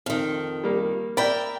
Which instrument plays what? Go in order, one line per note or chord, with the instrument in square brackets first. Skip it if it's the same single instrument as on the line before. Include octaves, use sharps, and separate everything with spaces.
[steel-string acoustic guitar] F2 D#3
[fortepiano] G3 A#3
[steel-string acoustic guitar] A#4 E5 G5 [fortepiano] D5 B5